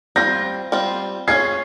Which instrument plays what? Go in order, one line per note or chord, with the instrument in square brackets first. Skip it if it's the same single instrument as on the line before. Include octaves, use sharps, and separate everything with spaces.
[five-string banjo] G3 C4 F4 [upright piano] G6 A#6
[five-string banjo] G3 C4 F4
[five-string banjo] C#4 F4 G#4 [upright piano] G#6 C7